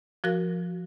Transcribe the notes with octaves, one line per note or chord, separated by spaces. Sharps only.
F3 F#4 A#4 F#6